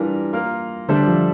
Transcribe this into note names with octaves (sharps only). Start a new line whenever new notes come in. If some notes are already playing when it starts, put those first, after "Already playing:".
Already playing: E3 G3 D4 F4 A#4
A#3 F4 A#4
D3 G3 D4 A4 C5 E5
F3